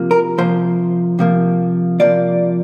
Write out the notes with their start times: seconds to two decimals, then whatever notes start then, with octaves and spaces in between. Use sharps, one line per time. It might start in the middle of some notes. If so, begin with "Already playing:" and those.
Already playing: C3 F3 A#3
0.11 A#4
0.38 C3 F3 A#3 C5
1.19 C3 F3 A#3
2.00 C3 F3 A#3 D5